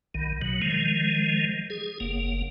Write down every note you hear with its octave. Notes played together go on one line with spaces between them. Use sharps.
B1 D#3
B2 F#3
D#3 F3 G#3
G#4
F#1 A#3